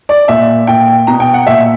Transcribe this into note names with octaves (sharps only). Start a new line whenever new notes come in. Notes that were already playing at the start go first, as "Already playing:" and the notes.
D5
A#2 E5
A#2 G5
B2 A#5
G5
F#5
A#2 E5